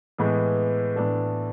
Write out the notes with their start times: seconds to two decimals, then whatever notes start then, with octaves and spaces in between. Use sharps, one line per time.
0.18 A2 E3 G#3 B3
0.96 A2 E3 B3 D4 A4